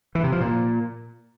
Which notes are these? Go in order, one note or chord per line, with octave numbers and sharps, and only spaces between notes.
E3
C3
F3
A#2